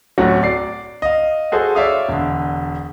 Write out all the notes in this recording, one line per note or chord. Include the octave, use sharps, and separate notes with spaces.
D1 F#3 A3 C#4 F#5
D5 C7
D#5 F5
F#4 G#4 A4 C5
C#5 D5 E5 F5 D#6
E1 D3